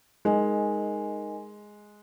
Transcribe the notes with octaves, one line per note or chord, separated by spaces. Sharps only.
G#3 D#4 A#4 D#5 G#5